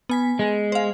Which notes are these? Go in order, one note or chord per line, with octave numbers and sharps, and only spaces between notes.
B3 G#5 B6
G#3
C5 F5